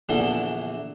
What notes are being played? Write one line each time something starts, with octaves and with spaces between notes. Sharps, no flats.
A#1 E2 D3 E3 C6